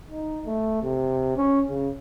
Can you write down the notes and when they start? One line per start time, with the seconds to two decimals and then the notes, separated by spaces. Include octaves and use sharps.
0.11 D#4
0.46 A3
0.82 C3
1.37 C#4
1.69 C#3